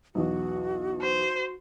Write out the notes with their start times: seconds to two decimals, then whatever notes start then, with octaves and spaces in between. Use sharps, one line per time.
0.15 B1 E2 F#4
1.02 C5